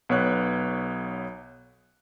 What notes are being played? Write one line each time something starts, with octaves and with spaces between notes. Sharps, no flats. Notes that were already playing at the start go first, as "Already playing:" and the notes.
B1 B3 C#5 F#6